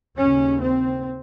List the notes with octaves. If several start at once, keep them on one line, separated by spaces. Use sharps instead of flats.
D#2 C#3 C#4
C4